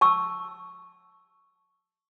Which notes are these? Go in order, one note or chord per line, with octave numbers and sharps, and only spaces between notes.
A5 C#6 E6